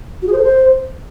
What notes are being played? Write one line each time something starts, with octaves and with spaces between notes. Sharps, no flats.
F#4
G#4
C5
A4
C5